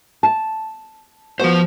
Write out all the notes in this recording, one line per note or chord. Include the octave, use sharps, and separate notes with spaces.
A5
F3 B3 F#4 C5